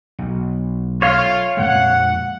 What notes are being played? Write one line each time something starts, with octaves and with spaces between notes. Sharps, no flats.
B1
A3 F4 C#5 F5
F2 A#2 G#3 F#5